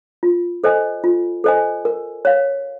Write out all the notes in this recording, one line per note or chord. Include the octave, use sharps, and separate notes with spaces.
F4
A4 C5 D#5 G#5
F4
A4 C5 D#5 G#5
A#4
C#5 F5